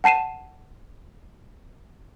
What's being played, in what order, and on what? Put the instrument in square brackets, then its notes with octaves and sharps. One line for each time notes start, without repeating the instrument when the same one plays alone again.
[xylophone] F#5 A5 C7 D#7 E7